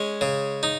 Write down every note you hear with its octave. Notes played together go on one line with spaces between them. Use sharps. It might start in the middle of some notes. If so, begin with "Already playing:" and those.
Already playing: G#3 C#4
C#3
D#4